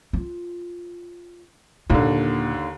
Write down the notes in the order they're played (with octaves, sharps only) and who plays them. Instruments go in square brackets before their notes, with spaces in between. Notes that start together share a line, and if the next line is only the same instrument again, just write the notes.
[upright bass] F4
[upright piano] D#2 D3 [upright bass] A#2 A#3